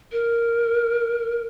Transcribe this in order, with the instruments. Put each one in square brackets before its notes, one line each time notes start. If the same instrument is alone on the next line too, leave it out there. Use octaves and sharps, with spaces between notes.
[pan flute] A#4